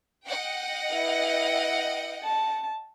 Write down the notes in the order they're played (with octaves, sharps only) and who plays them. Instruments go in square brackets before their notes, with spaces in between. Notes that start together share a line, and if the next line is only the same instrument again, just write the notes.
[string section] D#5 F#5 G5
[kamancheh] E4 B4
A5